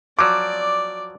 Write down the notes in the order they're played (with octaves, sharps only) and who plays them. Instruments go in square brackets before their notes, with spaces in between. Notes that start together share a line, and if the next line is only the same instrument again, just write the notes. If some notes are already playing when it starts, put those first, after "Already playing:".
[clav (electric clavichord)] F3 F#3 [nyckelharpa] D5 [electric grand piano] D6